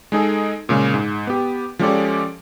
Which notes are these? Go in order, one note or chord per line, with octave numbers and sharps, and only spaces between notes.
G#3 D#4 G#4 A4
A#2 C#3 G#3
G#2
B3 G4
F3 G#3 C#4 G4 A4 D5